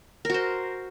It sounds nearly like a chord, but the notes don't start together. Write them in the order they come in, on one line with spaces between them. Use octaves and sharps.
A#4 F#4 C5